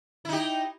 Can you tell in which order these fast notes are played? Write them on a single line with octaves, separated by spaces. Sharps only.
E4 D#4 G4